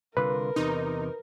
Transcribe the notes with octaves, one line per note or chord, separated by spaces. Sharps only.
C2 D3 F4 A#4 B4
E2 C3 D#4